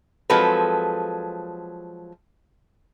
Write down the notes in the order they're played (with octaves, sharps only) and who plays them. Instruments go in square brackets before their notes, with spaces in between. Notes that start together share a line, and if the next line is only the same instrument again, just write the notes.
[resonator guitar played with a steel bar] F3 F#3 G#3 C4 A4 B4